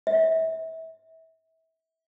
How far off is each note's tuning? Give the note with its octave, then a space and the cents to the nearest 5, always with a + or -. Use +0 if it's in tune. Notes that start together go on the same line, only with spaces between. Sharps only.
E5 -30